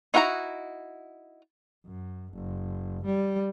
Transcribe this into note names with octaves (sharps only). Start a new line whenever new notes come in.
D#4 E4 F#4 G5 A#5
F#2
F#1
G3